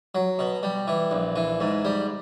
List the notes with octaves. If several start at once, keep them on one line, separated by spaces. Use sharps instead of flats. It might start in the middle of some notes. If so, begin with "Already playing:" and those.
F#3
B2
G3
E3
A#1
E3
G#2
G3